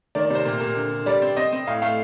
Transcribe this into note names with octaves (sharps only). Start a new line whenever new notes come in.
D#3 D5
D5
C3 C5
A#2
A#2
D3
D3
G3 D5
C4
C4 D#5
C4
A2 F5
A3 F5